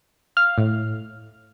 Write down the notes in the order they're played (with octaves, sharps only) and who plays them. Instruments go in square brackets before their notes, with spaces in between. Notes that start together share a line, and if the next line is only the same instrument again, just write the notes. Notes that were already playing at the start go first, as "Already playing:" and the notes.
[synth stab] F5
A2